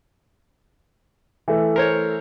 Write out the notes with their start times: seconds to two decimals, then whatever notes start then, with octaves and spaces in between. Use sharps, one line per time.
1.48 E3 A3
1.76 A#4 C5 C#5